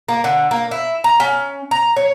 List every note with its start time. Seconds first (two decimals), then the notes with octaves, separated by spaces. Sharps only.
0.08 A#3
0.24 D3
0.51 A#3
0.71 E4
1.04 A#5
1.20 C#4
1.71 A#5
1.97 C#5